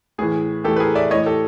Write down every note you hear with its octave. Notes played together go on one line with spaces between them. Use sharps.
A2 E3 G#4
A2 E3 G4 A4
B4
G#4 A#4
D5 E5
A2 E3 C#5 D#5
G4 A4